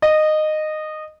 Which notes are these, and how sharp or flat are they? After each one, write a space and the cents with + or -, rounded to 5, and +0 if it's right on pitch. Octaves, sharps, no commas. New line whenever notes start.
D#5 -15